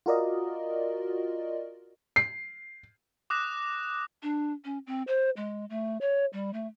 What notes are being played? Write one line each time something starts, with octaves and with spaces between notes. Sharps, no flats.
F4 F#4 A#4 D5 D#5
C7
D6 D#6 F#6 A#6 E7
D4
C#4
C4
C5
G#3
A3
C#5
G3
A3